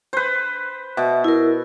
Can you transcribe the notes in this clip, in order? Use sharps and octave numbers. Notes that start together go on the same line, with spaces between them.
B4 C5
B2 E5
E4 A#4